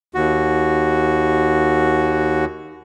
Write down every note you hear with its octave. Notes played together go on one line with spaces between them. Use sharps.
D#2 F#4